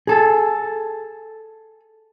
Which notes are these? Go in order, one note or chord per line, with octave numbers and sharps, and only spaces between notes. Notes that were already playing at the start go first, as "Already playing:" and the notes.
G#4 A4